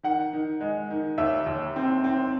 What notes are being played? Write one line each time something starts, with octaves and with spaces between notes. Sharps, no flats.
D#3 F#5
D#3
G#3
D#3
D#2 E5
D#2
C4
C4